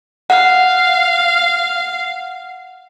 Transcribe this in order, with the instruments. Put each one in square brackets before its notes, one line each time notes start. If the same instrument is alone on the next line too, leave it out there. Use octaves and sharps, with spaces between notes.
[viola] F5 [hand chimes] F#5